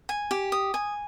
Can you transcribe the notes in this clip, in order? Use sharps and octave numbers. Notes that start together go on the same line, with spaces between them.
G#5
G4
D#6
G#5